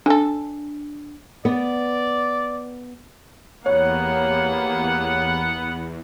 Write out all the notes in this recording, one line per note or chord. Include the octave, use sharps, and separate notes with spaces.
D3 D4 A4
B3 D5
E2 A#3 B3 G4 C#5 F#5